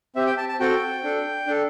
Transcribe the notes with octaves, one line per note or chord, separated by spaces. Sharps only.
C4 G4 E5
G5
A5
A5
C4 F#4 A4 G5
D4 A4
D4 A4